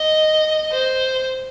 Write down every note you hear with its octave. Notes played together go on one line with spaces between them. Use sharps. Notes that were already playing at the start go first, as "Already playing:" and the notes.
Already playing: D#5
C5